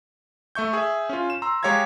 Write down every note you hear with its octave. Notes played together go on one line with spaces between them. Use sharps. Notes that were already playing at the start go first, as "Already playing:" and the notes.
A3 E5 C#6 G6
G#4 E5
C#4 F4
E7
A#5 C6 E6
G#3 G4 C#5 F5 A#5 G#6